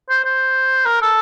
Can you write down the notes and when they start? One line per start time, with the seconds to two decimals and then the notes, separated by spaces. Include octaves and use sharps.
0.09 C5
0.24 C5
0.85 A#4
1.02 A4